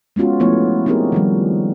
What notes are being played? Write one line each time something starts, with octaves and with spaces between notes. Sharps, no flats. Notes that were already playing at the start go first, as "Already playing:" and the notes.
G#3 B3 C#4 F4 F#4
F3 A3 B3 E4 C#5
B3 C4 D#4 G4 G#4 A#4
D#3 F3 G3